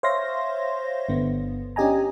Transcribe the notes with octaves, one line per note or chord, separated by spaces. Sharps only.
C5 C#5 E5 F5 C6 A#6
G1 D3 B3
C#4 D4 G4 D#5 G#5 A#5